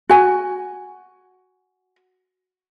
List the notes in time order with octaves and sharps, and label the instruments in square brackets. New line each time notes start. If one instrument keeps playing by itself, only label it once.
[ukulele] F#4 G#5